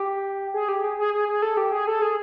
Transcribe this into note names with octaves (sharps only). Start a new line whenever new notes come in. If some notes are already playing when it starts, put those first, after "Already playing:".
Already playing: G4
G#4
G4
G#4
G#4
G#4
G#4
A4
G4
G#4
A4
G#4